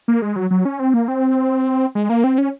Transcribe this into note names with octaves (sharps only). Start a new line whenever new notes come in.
A#3
G#3
F#3
F#3
C#4
C4
A#3
C4
G#3
A#3
C4
C#4